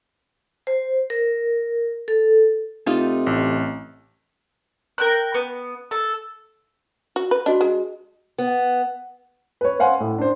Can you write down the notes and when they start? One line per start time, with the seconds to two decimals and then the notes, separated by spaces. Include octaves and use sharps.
0.67 C5
1.10 A#4
2.08 A4
2.86 C3 A3 D#4 F4
3.27 A1
4.98 A#4 G5 F#6
5.34 B3
5.91 A4
7.16 F#4
7.31 B4
7.46 D4 F#4 D#5
7.61 G#3
8.38 B3
9.61 B4 C#5
9.79 B4 C5 F5 F#5 G#5 C6
10.00 A2
10.18 D4 C5